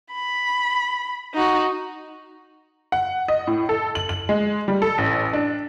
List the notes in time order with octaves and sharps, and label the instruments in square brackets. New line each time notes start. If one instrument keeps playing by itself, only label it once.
[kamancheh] B5
D#4 F#4
[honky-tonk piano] F#5
D#5
A2
A4
F#7
F#7
G#3
G3
A4
A1
D4